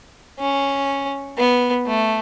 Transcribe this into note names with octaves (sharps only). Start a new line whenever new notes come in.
C#4
B3
A3